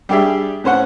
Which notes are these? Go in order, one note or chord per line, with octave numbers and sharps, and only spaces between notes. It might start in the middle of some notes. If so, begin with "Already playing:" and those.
G3 D4 G4 G#4 E5
A2 C#4 C5 F#5